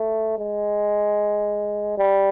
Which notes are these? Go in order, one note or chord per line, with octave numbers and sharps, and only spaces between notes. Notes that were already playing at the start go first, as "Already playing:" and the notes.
Already playing: A3
G#3
G3